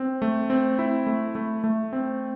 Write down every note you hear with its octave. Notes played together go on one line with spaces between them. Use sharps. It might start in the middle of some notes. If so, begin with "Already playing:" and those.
Already playing: C4
A3
C4
E4
A3
A3
A3
C4